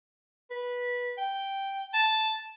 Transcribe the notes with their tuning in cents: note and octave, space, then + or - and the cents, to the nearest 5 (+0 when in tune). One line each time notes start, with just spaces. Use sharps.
B4 -15
G5 -5
A5 -5